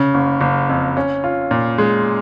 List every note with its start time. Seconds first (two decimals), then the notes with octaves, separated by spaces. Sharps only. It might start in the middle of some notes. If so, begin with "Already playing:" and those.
Already playing: C#3
0.14 F#1
0.41 F#1
0.69 F2
0.97 C#4
1.24 F4
1.51 A#2
1.78 G#3